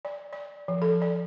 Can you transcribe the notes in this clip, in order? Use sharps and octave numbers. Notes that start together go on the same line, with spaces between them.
D5
D5
F3
A4
D5